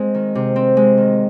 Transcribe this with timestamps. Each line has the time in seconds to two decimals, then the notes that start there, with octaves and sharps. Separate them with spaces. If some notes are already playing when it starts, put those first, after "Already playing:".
Already playing: G#3 C4
0.15 D#3
0.35 C3
0.56 C4
0.77 G#3
0.97 D#3